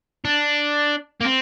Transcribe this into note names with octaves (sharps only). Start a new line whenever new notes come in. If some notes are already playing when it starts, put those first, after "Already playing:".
D4
A#3
C4